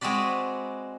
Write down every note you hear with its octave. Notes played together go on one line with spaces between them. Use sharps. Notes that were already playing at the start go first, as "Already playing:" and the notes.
G#3 C4 F#4 B4 D5